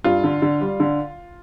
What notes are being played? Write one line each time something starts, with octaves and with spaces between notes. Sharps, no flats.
G2 F4
D3
D3
G3
D3